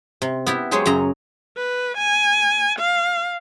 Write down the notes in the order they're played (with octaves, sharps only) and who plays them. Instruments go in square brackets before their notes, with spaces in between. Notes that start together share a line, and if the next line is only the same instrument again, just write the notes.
[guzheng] C3
B3 E4 G4
F#3 G#3 G4 G#4 C5 C#5
F#2 C#3 F#3 D#5 A#5
[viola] B4
G#5
F5